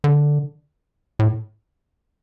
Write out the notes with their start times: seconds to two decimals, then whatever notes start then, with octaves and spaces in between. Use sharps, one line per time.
0.04 D3
1.19 A2